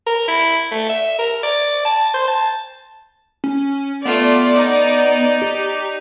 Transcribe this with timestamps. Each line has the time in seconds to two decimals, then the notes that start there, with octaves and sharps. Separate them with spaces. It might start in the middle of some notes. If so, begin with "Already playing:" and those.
0.07 A#4
0.28 E4
0.71 A3
0.89 E5
1.19 A#4
1.43 D5
1.85 A5
2.14 C5
2.28 A5
3.44 C#4
4.05 A3 B3 F4 D5
4.55 D#4
5.42 G4